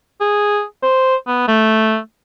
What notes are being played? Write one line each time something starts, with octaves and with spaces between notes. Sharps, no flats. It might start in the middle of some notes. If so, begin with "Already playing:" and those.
G#4
C5
B3
A3